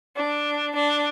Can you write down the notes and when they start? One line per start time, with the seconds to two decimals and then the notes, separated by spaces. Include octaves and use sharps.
0.18 D4
0.75 D4